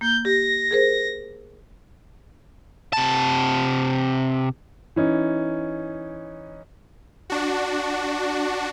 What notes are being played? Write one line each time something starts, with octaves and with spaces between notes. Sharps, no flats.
A#3 G6
G4 A#6
G#4 A#4 C5
C3 A5
E3 C#4 D#4
D4 F#4